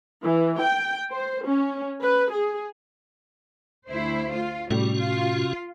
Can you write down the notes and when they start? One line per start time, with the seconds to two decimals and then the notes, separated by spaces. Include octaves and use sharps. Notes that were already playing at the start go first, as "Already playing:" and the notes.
0.22 E3
0.59 G5
1.10 C5
1.45 C#4
2.03 B4
2.32 G#4
3.90 D2 E4 C5
4.33 F4
4.71 A2 C3 G3 C#4 F#4
4.99 F4